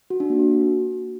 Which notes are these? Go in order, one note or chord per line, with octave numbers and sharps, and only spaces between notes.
F#4
D4
A#3
F#4